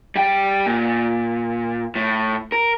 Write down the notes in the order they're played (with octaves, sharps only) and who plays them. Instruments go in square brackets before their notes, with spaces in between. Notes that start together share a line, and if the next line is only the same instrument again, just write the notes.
[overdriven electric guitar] G3 G5
A#2
A2
A#4